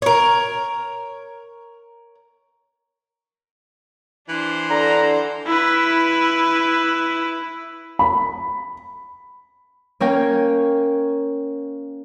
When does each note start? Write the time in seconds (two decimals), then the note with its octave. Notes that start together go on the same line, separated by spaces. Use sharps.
0.02 A#4 C#5
4.29 E3 D4 C5
4.70 D3 A#5
5.47 E4 B4
7.99 B5
10.00 A#3 C#4 A#4 C#5 G5